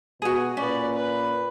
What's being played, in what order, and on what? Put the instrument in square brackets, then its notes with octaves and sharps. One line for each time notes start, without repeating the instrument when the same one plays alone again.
[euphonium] B2 [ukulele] F#4 G#4
[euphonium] A#2 [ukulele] C#4 [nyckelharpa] B4 D5
[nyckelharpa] B4